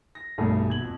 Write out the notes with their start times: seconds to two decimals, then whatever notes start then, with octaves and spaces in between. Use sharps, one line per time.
0.15 A#6
0.38 F1 B1 G2 A3 G#4
0.67 D#2 B2 G#6 F#7
0.81 F2